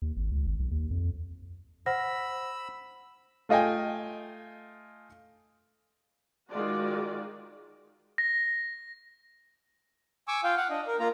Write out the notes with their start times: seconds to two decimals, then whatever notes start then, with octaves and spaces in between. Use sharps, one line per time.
0.02 D#2
0.17 G#1
0.32 C#2
0.47 G#1
0.60 B1
0.71 D#2
0.91 F2
1.86 C5 F#5 B5 E6 A#6
3.49 A3 F4 D#5 G5 G#5
6.50 D#3 G#3 F4 F#4 D5
8.18 A#6
10.28 G#5 C#6 D6 E6
10.44 F4 F5 G5
10.57 F5 F#5
10.70 D4 D#5
10.87 A#4
11.00 A#3 F4 A#5